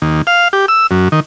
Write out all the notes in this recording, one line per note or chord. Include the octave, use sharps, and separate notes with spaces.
D#2
F5
G4
E6
F#2
D#3